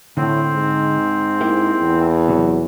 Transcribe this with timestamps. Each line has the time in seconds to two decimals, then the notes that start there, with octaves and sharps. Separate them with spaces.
0.17 A2 D3 C4
0.53 G#2
1.41 A#3 E4 G4
1.81 E2
2.28 C3 F#3